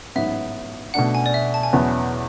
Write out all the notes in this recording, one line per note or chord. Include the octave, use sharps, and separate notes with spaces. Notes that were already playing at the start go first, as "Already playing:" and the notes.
A1 G#2 F#3 B3 E5
B2 A3 D4 F#5
G#5
D5
E5
A5
G#5
E2 B2 F#3 B3 E4